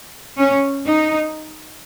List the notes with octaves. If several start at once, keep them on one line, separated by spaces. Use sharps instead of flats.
C#4
D#4